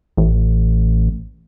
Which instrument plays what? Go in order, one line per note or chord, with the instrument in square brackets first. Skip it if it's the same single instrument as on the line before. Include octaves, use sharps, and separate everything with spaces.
[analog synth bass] A1